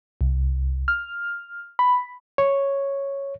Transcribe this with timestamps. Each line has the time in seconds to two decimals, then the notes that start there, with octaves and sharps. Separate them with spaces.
0.21 C2
0.88 F6
1.79 B5
2.38 C#5